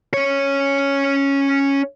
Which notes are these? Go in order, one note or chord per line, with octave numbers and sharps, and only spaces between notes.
C#4 C#5